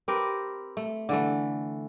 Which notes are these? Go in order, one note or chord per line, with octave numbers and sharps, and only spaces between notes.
C4 G4 A#4 B4
A3
D3 E3 A3